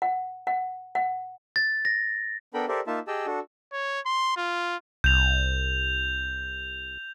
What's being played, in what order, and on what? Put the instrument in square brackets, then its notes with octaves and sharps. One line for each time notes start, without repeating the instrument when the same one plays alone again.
[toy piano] F#5
F#5
F#5
[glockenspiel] A6
A#6
[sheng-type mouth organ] B3 D4 A4 A#4 G5 B5
G4 A4 A#4 C5 D5 E5
A#3 D#4 F4 E5 A5
G4 G#4 D#5 G5 A5 E6
D4 F#4 A4
[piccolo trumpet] C#5
C6
F4
[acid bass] C2 [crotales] G6 F7